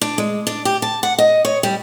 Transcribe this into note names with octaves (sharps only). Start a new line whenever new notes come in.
D4
G#3
D4
G4
A5
F#5
D#5
C#5
G3